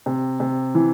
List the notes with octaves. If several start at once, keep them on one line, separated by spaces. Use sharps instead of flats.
C3
C3
E3